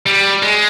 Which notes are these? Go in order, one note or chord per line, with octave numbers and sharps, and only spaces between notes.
G3
G#3